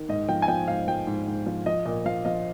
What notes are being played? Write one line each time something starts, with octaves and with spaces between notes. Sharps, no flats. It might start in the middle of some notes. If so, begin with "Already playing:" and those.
Already playing: D#3
G#2 D#5
F3 G5
G#5
F3 G5
G#2 F5
F3 G5
G#2
G#2
F3
F3 D#5
A#2 D#5
F3 F5
F3 D#5